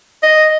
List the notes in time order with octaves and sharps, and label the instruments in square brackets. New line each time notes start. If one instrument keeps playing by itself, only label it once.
[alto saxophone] D#5